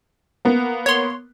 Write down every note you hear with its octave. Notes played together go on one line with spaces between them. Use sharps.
A#3 B3
C#5 C6